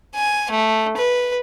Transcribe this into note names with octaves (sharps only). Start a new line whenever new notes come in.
G#5
A3
B4